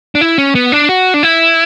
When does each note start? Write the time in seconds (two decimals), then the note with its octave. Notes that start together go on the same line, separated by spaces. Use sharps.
0.15 D4
0.21 E4
0.38 C#4
0.55 B3
0.72 D4
0.89 F#4
1.14 D4
1.23 E4